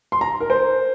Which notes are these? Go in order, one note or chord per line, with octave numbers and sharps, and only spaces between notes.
C6
A#5
A#4
C5